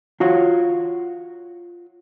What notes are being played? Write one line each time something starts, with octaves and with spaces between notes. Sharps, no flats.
F4 F#4 C#5